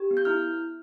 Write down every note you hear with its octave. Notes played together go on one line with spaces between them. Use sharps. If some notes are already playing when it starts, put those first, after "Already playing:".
Already playing: G4
B3
G6
E4 F6